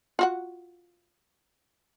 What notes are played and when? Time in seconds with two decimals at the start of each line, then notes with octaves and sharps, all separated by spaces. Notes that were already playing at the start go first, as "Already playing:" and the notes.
0.19 F4 F#4 F#5